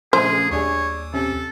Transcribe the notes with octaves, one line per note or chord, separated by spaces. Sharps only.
A#1 C#3 A3 C#4 G#4 C5
D#2 G3 D4 G#4 C#5
C3 C#4 A4